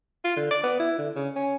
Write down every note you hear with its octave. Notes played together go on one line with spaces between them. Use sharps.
F4
D3
D5
B3
E4
D3
C#3
C#4